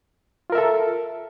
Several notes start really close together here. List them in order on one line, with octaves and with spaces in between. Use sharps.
F4 A#4 E5 A4